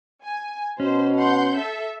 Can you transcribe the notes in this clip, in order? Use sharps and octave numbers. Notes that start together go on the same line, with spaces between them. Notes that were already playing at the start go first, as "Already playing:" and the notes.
G#5
B2 C#4 C5
F#5 C6 G6
A4 E5